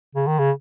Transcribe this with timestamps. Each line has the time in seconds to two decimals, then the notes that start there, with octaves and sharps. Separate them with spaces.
0.15 C#3
0.27 D#3
0.39 C#3